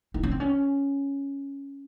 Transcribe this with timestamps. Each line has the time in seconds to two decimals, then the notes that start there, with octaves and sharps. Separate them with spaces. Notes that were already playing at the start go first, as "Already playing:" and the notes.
0.14 D#4
0.23 C#4
0.31 C4
0.40 C#4